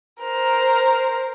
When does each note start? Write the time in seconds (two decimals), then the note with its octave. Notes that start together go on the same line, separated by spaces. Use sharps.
0.22 A#4 C5